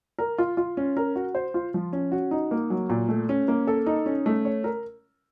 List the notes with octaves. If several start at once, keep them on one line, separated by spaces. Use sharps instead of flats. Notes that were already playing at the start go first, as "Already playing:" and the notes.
A#4
F4
F4
C#4
A#4
F#4
C5
F4
F3
C#4
F#4
D#4
A#3
F#3
A#2
A3
C#4
A#3
A4
D#4
C#4
A3
C#5
A#4